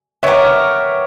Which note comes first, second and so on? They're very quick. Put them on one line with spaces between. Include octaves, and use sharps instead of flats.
B3 E4 C#5 E5 G4 A#4